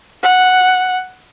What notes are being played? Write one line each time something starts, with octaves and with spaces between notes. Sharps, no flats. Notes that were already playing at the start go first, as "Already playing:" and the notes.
F#5